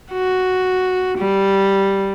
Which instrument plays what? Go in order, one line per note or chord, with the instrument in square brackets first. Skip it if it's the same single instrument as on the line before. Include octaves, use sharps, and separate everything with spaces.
[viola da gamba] F#4
G3